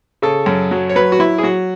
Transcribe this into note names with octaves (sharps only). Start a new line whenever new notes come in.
C#3 A4
F#2
F#3
C#5
F#3 B4
F#4
F#3 E4
G#4
F#3 F#4